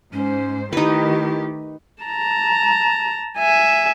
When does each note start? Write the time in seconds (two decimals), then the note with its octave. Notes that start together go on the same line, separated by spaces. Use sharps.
0.13 G#2 C#4 C5
0.73 D#3 A3 D#4 E4 G4 B4
2.03 A5 A#5
3.38 E5 G#5